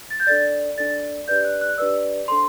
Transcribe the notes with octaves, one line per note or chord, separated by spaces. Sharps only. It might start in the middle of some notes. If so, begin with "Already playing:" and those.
A6
G6
D4 A4 D5 A6
D4 A4 D5 A6
D4 G4 B4 D5 G6
F#6
F#6
D4 G4 B4 D5 E6
D4 A4 C5 C6